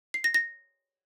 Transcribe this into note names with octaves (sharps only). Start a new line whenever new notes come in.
C7
A#6
A#6